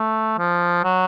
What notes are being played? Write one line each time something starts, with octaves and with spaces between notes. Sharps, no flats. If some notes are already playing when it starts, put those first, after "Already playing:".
Already playing: A3
F3
F#3